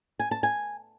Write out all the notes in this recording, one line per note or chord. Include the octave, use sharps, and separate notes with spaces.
G#5
A5
G#5